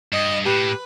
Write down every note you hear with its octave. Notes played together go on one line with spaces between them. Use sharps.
G2 D#5
A2 G4 B4